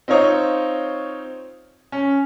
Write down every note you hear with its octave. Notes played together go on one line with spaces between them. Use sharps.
C4 D#4 F4 C#5 D#5
C#4